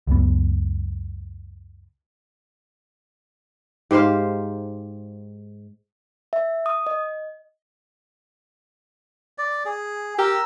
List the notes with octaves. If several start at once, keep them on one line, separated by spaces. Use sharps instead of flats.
C#2 F#2 B3
G#2 G4 C5 F5
E5
D#6
D#5
D5
G#4
G4 A#4 E6